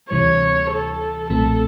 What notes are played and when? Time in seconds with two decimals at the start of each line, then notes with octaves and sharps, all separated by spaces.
0.11 D2 C3 E3 G3 C#5
0.70 A4
1.30 B1 A#2 F3 A3 C4 A4